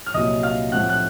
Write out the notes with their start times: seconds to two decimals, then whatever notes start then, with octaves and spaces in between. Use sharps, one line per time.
0.06 F6
0.14 C2 A#2 F#3 D#5 D#6
0.43 F5 F6
0.72 A2 F3 A3 C4 F#5 F#6
0.89 F#6